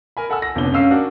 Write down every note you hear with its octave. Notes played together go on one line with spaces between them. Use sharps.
A#4 G#5 B5
A4 F#5 G#5 E6
A#6
F1 D3 B3 C#4 D4 G7
F#2 D3 C#4 F5 E6 C7
D4 F#4 A#4